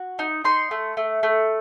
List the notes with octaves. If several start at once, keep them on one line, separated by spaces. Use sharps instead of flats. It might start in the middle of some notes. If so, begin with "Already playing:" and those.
Already playing: F#4
D#4
D#4 C6
A3
A3
A3